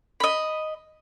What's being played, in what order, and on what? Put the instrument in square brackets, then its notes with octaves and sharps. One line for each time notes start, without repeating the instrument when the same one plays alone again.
[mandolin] D#5 B5